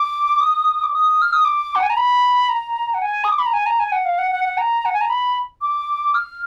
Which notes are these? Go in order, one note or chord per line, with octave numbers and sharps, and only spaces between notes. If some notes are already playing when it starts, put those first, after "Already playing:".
Already playing: D6
D#6
D6
D#6
F6
D#6
D6
F#5
G#5
A#5
B5
A#5
F#5
G#5
D#6
D6
B5
A#5
G#5
A#5
G#5
F#5
F5
F#5
F#5
F#5
A#5
F#5
G#5
A#5
B5
D6
F6